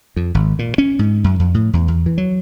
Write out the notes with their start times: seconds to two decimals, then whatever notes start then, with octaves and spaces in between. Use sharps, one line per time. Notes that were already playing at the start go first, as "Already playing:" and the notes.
0.16 F2
0.35 G#1
0.59 A#2
0.78 C#4
0.99 G#2
1.24 F#2
1.39 F2
1.54 A2
1.73 E2
1.88 E2
2.06 E3
2.18 F#3